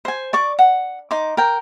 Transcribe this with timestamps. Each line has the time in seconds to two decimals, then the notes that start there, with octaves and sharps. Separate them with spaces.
0.05 C5 G#5
0.33 D5 C#6 D6
0.59 F#5
1.11 D#4 C6 D6
1.37 A#4 G5